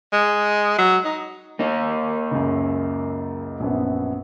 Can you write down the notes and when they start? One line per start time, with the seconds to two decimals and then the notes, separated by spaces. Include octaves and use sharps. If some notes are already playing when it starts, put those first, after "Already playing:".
0.13 G#3
0.78 F#3
1.05 D#4
1.59 A#3 D#4
2.31 C#2 F#2
3.60 A#1 F#2 B3